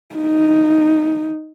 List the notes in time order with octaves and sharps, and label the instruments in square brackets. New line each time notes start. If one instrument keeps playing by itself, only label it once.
[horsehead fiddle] D#4